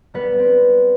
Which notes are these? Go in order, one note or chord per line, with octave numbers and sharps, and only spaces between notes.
G3 B3 B4
C4